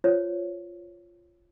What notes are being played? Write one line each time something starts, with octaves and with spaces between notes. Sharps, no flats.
F4 C5 C#5